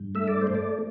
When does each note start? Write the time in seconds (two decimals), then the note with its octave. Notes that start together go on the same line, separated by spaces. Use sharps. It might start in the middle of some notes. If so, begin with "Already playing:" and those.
Already playing: G2
0.15 A3 E5
0.28 D5
0.42 C5
0.47 A3
0.55 D5